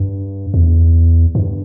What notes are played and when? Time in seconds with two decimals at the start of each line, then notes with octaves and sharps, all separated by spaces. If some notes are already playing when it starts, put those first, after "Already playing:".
Already playing: G2
0.54 E2
1.35 G2